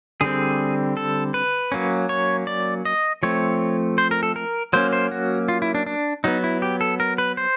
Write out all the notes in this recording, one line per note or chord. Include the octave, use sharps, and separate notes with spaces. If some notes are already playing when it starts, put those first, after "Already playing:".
D3 G3 C4 G#4
A4
B4
F#3 A#3 C#4
C#5
D5
D#5
F3 A3 C4 C#5
C5
A#4
A4
A#4
F#3 A#3 C#4 C5
C5
F#4
F4
E4
D4
D4
F#3 B3 D#4
E4
G4
A4
A#4
B4
C5